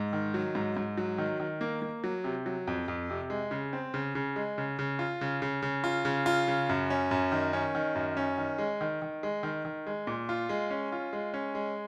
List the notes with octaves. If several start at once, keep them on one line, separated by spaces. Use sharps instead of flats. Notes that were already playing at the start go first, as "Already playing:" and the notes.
Already playing: G#2
D#3
F#3
G#2
G#2
F#3
D#3
D#3
A#3
A#3
F#3
C3
F#3
F2
F2
C3
G#3
C#3
C4
C#3
C#3
G#3
C#3
C#3
F4
C#3
C#3
C#3
F4
C#3
F4
C#3
F#2
C#4
F#2
D#3
C#4
D#3
F#2
C#4
D#3
G#3
D#3
D#3
G#3
D#3
D#3
G#3
A#2
F4
G#3
C#4
F4
G#3
C#4
G#3